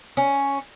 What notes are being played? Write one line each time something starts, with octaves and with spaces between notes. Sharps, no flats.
C#4